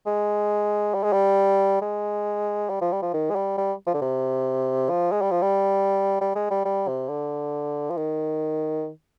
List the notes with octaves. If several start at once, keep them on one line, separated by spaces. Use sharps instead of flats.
G#3
G3
G#3
G3
G#3
G3
F3
G3
F3
D#3
G#3
G3
G3
F3
D3
C3
F3
G#3
G3
F3
G3
G3
G#3
G3
G3
C3
D3
F3
D#3